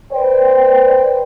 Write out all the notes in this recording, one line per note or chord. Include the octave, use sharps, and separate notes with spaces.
B4 C5 D5 G5